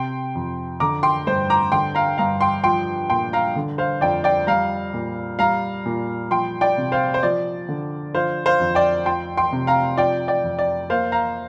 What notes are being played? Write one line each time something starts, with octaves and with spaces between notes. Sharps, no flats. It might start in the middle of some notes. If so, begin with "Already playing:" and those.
Already playing: C3 G5 C6
F2
D3 A#5 D6
G5 C6
G2 C5
A#5 D6
D3 G5 C6
F5 A#5
G2 F5 A#5
G5 C6
F3 G5 C6
A#2 G5 C6
F5 A#5
D3
C5 F5
F2 D5 G5
D5 G5
G3 F5 A#5
A#2
G3 F5 A#5
A#2
F3 G5 C6
D5 G5
C3
C5 F5
C5
F3 D5
D3
F3 C5 F5
C5 F5
F2
D5 G5
F3 G5 C6
G5 C6
C3
F5 A#5
F3 D5 G5
D5 G5
F2
D5
A#3 C5 F5
F5 A#5